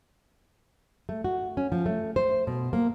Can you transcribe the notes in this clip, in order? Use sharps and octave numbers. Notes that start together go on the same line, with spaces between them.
A3
F#4
C#4
F3
A3
C5
B2
A#3